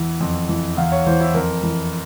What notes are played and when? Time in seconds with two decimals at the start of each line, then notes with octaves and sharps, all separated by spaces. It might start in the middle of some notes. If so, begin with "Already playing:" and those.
Already playing: E2 E3
0.21 F2
0.49 E3
0.77 E2 F5
0.92 C#5
1.07 E3 C5
1.21 E4
1.34 F2 A#4
1.63 E3